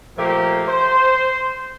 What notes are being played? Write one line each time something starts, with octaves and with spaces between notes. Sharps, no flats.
A#2 F3 A3 A#3 G4
C5